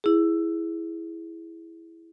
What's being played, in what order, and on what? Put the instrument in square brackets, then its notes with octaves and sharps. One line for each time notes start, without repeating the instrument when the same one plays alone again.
[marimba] E4 G#4